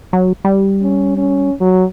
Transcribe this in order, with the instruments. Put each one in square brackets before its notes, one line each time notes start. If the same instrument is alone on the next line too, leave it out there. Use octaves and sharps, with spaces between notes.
[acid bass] F#3
G3
[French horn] C#4
C#4
F#3